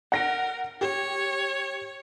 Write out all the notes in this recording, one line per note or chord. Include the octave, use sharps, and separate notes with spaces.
A#4 F#5 A#6 D7
G4 C#5